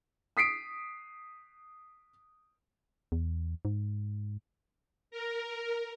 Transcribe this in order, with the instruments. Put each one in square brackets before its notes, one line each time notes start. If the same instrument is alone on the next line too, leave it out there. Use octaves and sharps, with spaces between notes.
[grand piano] D#6 B6 C7 D7
[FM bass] E2
G#2
[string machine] A#4